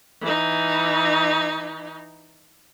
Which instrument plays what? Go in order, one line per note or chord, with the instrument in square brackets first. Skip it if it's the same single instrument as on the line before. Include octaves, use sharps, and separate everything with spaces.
[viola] E3 D#4